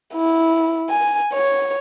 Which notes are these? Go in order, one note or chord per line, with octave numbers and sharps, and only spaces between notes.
E4
G#5
C#5